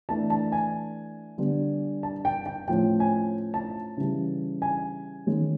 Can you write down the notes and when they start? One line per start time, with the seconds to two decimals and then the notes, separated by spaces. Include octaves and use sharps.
0.09 E3 A3 D4 A5
0.30 A5
0.52 G#5
1.38 D3 G3 B3 D4
2.03 A5
2.25 G5
2.46 G5
2.67 A2 F3 A3 C#4 G5
3.00 G#5
3.54 A5
3.97 C#3 E3 G3
4.62 G#5
5.26 D#3 G#3 C#4